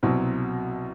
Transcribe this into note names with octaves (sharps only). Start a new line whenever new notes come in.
C2 B2 F#3 C4